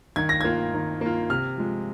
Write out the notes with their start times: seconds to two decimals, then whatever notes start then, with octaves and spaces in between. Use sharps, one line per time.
0.16 D#3 G#6
0.29 A#6
0.41 A#3 F4 G#6
0.73 D#3
1.01 A#3 F4
1.30 C3 F6
1.57 F3 G#3